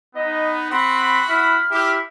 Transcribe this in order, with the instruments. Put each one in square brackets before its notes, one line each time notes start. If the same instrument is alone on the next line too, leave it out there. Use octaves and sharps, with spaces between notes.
[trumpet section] B3 D#4 [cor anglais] D#5
[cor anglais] C4 [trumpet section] F#4 F#5 B5
[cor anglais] E4 [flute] F6
[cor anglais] E4 [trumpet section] G4